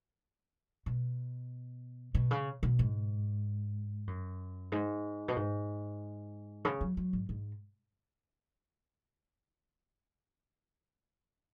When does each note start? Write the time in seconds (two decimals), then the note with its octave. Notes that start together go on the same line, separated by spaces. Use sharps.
0.86 B2
2.15 B2
2.31 C#3
2.63 B2
2.79 G#2
4.07 F#2
4.72 G#2
5.28 B2
5.36 G#2
6.65 C#3
6.81 F#3
6.97 F#3
7.13 G#2
7.29 G#2